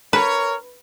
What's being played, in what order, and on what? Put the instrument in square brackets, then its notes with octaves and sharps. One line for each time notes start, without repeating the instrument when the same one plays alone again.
[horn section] A#4 C#5 [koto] B4